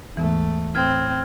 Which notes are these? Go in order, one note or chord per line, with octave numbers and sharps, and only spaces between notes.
D#2 G#2 E3 A3 B3
A2 C4 F6 G#6